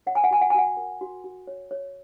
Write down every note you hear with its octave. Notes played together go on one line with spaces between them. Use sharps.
C#5 F#5
G#5
F#5
F#4 G#5
F#5
G#5
F#4 F#5
A#4
F#4
F#4
C#5
C#5